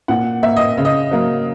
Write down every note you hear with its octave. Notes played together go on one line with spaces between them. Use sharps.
A#2 F#5
A#3 E5
D#5
C#3
D#5
F#3 A#3